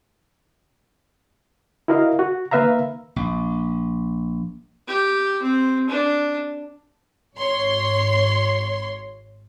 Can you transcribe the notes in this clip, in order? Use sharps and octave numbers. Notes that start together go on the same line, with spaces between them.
E4 F#4 A#4 D#5 F5
F#4
D#3 A#3 B4 E5 F5 A#5
A#1
G4
C4
D4
G#1 C#5 C6